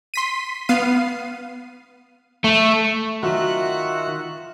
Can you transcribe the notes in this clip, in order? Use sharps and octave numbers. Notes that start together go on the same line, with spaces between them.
C6 B6 D#7
B3 F5 C7 D#7
A3
D#3 F#3 F4 F#4 E5 F#6